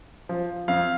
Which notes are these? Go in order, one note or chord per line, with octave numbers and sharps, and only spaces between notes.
F3
F2 F5